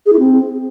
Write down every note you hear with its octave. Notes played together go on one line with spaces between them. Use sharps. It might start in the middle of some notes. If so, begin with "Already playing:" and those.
G#4
E4
C4